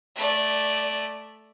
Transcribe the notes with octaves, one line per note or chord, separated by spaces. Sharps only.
A3 D5